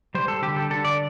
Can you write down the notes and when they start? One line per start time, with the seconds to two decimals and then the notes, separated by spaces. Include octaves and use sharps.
0.15 G3 C5
0.28 A4
0.42 D3 G4
0.56 A4
0.70 D3 A4
0.85 D5